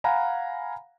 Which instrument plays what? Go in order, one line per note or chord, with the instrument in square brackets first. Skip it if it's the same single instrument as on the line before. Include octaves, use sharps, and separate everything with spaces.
[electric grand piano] F5 F#5 G#5 A#5 B5